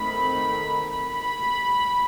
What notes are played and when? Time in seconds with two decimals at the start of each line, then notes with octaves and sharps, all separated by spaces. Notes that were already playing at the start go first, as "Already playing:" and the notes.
Already playing: D#3 A3 C4 B5
1.10 B5